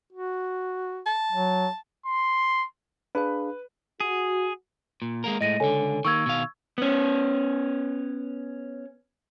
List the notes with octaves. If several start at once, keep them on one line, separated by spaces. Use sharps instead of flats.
F#4
A5
F#3
C6
D4 G#4 B4 F5
F#4 G#4
A#2
G#3 A#3 A#4
A2 G#3 A3 D#5 A#6 D#7
C#2 D3 A4 C#5 G#5
D#3 A#3 C#6 E6 G#6
B2 D#3 F5
B3 C#4